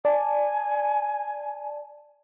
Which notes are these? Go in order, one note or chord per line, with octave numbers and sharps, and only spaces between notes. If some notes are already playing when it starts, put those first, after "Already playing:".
D5 G#5 A5